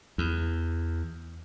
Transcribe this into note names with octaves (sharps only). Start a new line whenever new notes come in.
E2